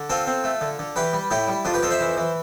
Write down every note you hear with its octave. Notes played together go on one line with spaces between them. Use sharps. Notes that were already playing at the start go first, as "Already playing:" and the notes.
Already playing: D3
C4 F4 A4
C4
A3
D3
D3
E3 G4 B4
G3
A2 E4 G4
G3
F2 D4 F4
G4 B4
F2 F4 A4
C5 E5
E3
E3